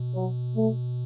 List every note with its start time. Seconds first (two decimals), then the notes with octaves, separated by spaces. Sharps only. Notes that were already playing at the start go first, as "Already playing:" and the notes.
Already playing: B2
0.13 F#3
0.55 A3